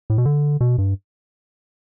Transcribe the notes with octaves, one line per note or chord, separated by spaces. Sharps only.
A2
B2
D3
B2
G2